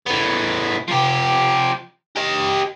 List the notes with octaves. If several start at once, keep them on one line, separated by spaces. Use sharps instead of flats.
A2 B3
F3 G4
G4 D#5